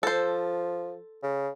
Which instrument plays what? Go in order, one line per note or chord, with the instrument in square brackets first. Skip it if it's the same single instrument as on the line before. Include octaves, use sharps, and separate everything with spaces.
[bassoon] F3 [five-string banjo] A4 C5
[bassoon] C#3